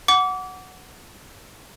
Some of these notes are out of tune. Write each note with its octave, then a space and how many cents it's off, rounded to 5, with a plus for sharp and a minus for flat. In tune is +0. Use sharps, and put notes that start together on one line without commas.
F#5 +0 D6 -30